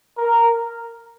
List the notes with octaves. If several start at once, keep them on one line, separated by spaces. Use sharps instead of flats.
A#4